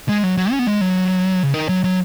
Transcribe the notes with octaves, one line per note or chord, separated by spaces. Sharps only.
G#3
F#3
F#3
C#4
B3
G#3
F#3
C#3
D#3
F#3
F#3